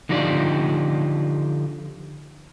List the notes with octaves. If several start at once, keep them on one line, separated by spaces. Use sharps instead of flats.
D3 F3 D#4 F4 G4 D5